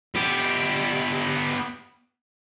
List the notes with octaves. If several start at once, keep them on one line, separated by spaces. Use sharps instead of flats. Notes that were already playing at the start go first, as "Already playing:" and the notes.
B3 G4